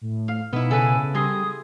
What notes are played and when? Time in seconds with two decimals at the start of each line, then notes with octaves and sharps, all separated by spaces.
0.01 A2
0.28 F5
0.53 B2 B3 D#4 E4
0.71 C#3 A4 B4 G#5
1.15 G3 G#4 C6 D#6